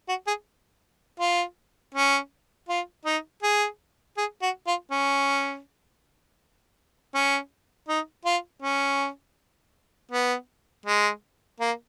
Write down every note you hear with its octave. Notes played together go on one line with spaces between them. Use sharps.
F#4
G#4
F4
C#4
F4
D#4
G#4
G#4
F#4
F4
C#4
C#4
D#4
F4
C#4
B3
G#3
A#3